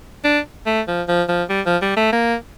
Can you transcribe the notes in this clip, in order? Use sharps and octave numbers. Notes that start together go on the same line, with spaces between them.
D4
A3
F3
F3
F3
G3
F3
G3
A3
A#3